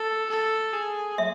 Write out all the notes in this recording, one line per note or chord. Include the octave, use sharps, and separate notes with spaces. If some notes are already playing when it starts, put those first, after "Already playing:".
Already playing: A4
A4
G#4
E5